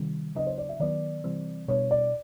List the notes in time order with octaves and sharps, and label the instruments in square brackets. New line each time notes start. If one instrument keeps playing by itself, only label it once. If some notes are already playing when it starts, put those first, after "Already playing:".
Already playing: [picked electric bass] C3 D#3 G3
[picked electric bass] C#3 F#3 B3 D4 [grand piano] D#5
[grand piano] C5
D5
E5
[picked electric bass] D#3 F#3 B3 [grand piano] D5
[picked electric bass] C3 E3 G3 C4
[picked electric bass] B2 G3 B3 D4 [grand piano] C#5
[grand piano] D5